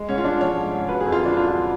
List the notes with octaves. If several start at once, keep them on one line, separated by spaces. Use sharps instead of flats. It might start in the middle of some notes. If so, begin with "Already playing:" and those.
Already playing: G#3
G#2 C#4
F4
G#2 D4
F3 C#5
G#2
G#2
F#3 B4
F2 G#4
F4
D3 D4
F#3 F4